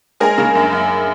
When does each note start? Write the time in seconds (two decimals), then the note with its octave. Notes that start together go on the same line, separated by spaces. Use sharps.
0.20 G#3 G#4 A#4
0.38 C#3
0.55 F#2
0.72 F#2